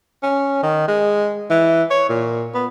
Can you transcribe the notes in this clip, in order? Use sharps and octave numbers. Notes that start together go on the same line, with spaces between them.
C#4
D#3
G#3
E3
C#5
A#2
B3